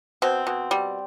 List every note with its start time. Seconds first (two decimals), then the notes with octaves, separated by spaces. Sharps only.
0.22 B2 C4
0.47 B2
0.71 G3